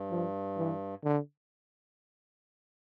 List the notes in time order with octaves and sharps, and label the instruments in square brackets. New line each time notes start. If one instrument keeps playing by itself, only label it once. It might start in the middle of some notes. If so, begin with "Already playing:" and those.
Already playing: [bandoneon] G2
[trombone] F3
E3
D3